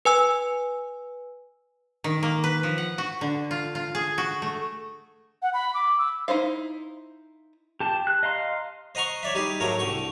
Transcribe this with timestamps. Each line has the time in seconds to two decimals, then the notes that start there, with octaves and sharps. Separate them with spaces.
0.05 B4 G#5 E6
2.04 D#3
2.23 A#3
2.44 B4
2.63 F3
2.78 F#5
2.98 F#4
3.21 D3
3.51 F4
3.75 F4
3.95 G#4
4.18 F#4
4.42 A3
5.42 F#5
5.54 B5
5.74 D6
5.98 E6
6.28 D#4 E4 C5 F5
7.80 G4 A5
8.07 F#6
8.23 D#5 F5 A#5 C6
8.95 C5 D#5 F#5 A#5 C6 C#6
9.23 C#5 D5 E5
9.35 G3 D#4 G4 G#4
9.60 G#2 F#3 A3 A#4 C#5 A#5
9.79 C2 D3 G5 C#6